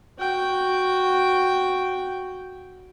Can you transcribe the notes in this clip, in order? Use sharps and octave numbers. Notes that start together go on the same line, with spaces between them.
F#4 G5